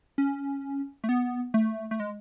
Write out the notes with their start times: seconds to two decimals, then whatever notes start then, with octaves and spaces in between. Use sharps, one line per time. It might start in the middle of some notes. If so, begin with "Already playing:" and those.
0.18 C#4
1.04 A3
1.09 B3
1.54 A3
1.91 A3
2.00 G#3